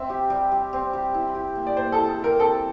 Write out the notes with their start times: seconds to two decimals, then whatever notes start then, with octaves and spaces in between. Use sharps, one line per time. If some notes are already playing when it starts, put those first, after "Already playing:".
Already playing: C4 E5
0.10 G4
0.30 G3
0.52 G3
0.73 C4
0.93 G4
1.14 E4
1.34 G4
1.55 A#3
1.67 D5
1.77 A#3 C5
1.92 A4
1.98 E4
2.08 A4
2.19 G4
2.24 A#4
2.39 C4 A4